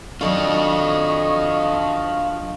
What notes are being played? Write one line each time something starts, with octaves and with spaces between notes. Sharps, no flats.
D#3 F#3 D4 F4 A4 D#5 C#6